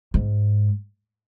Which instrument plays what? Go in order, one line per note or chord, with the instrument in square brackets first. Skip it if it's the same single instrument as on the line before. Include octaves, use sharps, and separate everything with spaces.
[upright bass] G#2